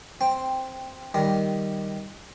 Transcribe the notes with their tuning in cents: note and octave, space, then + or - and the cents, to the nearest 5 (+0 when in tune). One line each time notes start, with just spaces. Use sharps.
C4 +0 G5 +10
D#3 +0 G3 +0